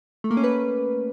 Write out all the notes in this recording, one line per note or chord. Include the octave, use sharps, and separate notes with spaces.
A3
A#3
C#4
B4